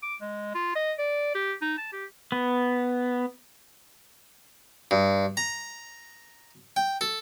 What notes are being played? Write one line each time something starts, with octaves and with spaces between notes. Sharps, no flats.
D6
G#3
F4
D#5
D5
G4
D#4
A5
G4
B3
G2
A#5
G5
A4